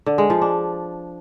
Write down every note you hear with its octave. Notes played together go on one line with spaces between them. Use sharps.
D3
G#3
F3
D4